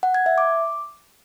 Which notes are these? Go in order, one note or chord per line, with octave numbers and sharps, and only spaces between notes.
F#5
G#6
E5
D6